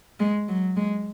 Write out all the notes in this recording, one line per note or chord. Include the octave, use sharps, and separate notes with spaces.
G#3
F#3
G#3